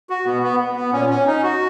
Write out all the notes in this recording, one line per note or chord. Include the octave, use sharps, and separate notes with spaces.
F#4
B2 B3
B3
B3
B3
A#2 C#4
C#4
D#4
F#4